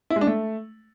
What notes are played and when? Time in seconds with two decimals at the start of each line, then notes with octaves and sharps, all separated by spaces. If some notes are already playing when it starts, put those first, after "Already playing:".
0.10 E4
0.16 G#3
0.21 D4
0.27 A3